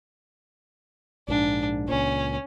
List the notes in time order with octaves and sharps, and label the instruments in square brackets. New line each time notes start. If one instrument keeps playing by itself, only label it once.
[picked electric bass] A#1 G#2 [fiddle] D4
[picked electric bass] C#2 A#2 [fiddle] C#4